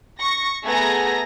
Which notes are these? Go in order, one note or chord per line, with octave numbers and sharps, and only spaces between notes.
C#6 A#6
A3 B3 G#4 G#5 A#5 A#6